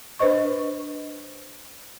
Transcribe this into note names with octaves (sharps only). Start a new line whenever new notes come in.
D4 B4 C5 D#5 C#6